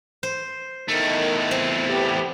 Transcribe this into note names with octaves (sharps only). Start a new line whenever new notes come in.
C5
E2 D#3 A3
C4
B3 G4